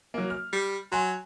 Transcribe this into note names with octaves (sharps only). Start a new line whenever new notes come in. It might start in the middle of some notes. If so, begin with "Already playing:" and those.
F#3 A#3
F6
G3
F#3 G#5 C6